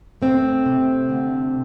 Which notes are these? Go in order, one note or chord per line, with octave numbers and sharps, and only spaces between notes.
A3 C4
C3
D3